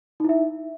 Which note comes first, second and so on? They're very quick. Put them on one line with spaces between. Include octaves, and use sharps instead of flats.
D#4 E4 E5